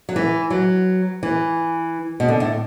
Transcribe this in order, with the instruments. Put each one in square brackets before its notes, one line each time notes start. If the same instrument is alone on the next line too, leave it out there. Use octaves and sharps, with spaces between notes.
[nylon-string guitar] F#3
E3
F#3
E3
B2
D3
A2